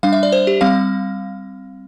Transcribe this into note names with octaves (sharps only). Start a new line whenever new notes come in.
G3 D4 F5
E5
D5
C5
G4
G3 C4 F5